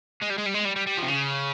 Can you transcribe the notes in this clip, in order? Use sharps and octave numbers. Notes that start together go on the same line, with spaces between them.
G#3
G3
G#3
G3
G#3
G3
G3
G3
F3
C3
C#3